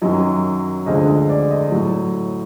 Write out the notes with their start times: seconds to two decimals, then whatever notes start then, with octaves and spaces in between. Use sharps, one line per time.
0.02 F#2 D#3 F#3 D#5
0.86 D2 D3 F3 G#3 D#5
1.08 D#5
1.30 D5
1.51 D#5
1.71 A2 F#3